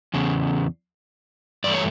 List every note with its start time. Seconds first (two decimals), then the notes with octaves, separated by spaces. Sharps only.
0.14 E2 C#3
1.64 G2 E3 A3 D5
1.74 C#5